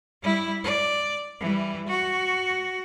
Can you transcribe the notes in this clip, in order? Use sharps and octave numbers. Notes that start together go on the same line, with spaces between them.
G3 E4
D5
E3 G3
F#4